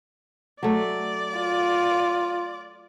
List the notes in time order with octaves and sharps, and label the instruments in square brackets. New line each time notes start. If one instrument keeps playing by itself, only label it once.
[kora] F#3 A3 [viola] D5
[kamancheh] F4